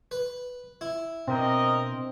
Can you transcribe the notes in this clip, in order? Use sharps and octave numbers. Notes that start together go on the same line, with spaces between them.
B4
E4
B2 C4 D4 A#4 D#5 A#5